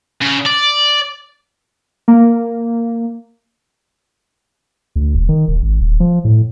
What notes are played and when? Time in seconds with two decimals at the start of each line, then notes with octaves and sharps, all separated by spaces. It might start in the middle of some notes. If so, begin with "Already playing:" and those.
0.21 C#3
0.46 D5
2.08 A#3
4.96 D2
5.15 E1
5.29 D#3
5.48 E1
5.62 G#1
5.80 D#1
6.00 F3
6.25 A2